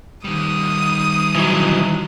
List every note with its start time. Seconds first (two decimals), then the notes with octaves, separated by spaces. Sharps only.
0.24 D#3 G3 D#6
1.35 E3 F#3